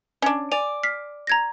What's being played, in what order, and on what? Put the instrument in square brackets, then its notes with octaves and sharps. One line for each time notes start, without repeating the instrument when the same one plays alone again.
[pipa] C#4 D4
[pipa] D5 [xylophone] G#5 F7
[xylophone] F6 B6 C7
A#5 G#6 A#6